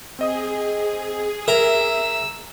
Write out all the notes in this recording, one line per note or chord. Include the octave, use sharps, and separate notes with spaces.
C4 G#4 D#5 D#6
A#4 E5 E6